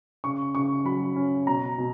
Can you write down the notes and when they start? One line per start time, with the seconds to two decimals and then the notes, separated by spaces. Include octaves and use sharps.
0.24 C#3 C#6
0.55 C#3 C#6
0.85 F#3 B5
1.16 C#4
1.47 B2 A#5
1.78 B2